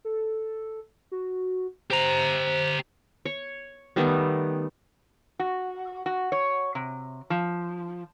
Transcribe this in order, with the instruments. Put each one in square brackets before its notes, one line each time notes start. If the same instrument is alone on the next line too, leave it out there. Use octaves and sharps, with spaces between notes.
[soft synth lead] A4
F#4
[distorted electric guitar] G4 A#5 [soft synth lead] C5
[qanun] C#5
D#3 G3 A3 B3
[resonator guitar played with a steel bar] F#4
F#4
C#5
C3
F3